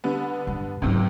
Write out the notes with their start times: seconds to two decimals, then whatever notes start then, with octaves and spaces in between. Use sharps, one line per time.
0.04 D3 G3 B3
0.47 G2
0.82 C#2 G#2 C3 D#3 F#3